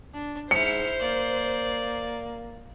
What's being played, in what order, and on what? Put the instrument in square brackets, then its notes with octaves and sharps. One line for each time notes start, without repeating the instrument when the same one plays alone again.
[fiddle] D4
[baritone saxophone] G#2 [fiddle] E4 F6 [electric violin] C5 [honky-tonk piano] C#7
[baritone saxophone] A#3 [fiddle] D5